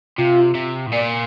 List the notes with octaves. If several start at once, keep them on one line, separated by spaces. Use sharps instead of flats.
C3 F4
C3
A2
A#2 D5